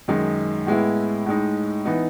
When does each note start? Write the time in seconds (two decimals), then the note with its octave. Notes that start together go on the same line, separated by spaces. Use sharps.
0.08 F#2 D#3 G#3 D#4
0.67 A2 G#3 B3 E4
1.26 A2 G#3 D#4
1.85 E3 B3 D#4